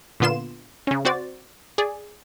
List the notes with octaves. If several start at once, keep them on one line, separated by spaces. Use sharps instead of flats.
A#2 D3 B3 F4 C6 E7
C#3 C#4
C4 F#4 C5 D5 A6
G#4 D5